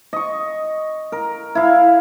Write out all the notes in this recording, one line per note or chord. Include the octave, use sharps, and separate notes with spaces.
D#5 C#6
A#4
E4 F5